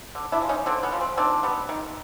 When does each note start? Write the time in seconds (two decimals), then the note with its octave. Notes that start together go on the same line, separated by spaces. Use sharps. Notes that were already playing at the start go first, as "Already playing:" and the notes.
0.15 D3
0.32 D4 E4
0.41 F3 G#3
0.49 C#4 D#4
0.66 D3 C4 D4
0.83 B3 C#4
0.92 F3 G#3
1.01 C4
1.17 D#3 C4 D4
1.43 G3 B3
1.69 D#3